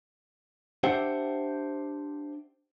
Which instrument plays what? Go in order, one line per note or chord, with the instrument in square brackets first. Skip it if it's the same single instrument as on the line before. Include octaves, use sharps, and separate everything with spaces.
[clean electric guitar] D4 G4 C5 E5 F#5 G5